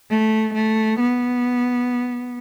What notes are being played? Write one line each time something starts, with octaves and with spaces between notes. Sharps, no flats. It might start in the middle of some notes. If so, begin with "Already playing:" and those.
A3
A3
B3